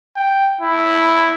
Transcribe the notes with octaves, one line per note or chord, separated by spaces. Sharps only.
G5
E4